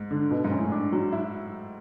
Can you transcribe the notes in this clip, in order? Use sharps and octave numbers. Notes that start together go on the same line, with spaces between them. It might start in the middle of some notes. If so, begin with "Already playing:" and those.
Already playing: G#2
D3
B2
G#2
C#4
A2
D4
F#3
E4